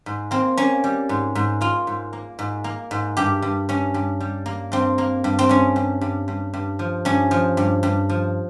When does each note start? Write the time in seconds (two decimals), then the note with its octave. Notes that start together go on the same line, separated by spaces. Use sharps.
0.06 G#2
0.31 A#3 C4
0.57 A#3 C#4
0.84 G3
1.09 G#2
1.35 G#2
1.61 A#3 F4
1.87 G#2
2.13 A#3
2.39 G#2
2.64 A#3
2.91 G#2
3.17 G2 G4
3.42 G2
3.69 G2 C#4
3.94 G2
4.20 G3
4.46 A#3
4.72 G2 C4
4.98 A#3
5.24 G2
5.39 C4
5.49 G2 C#4
5.76 G2
6.01 G2
6.28 G2
6.54 G2
6.79 F3
7.05 G2 C#4
7.31 F3
7.57 G2
7.83 G2
8.09 F3